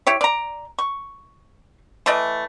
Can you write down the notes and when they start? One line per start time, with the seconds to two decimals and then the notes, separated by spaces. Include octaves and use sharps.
0.07 E4 G4 C#5
0.21 D5 A#5
0.79 C#6
2.06 E3 A3 D5 D#5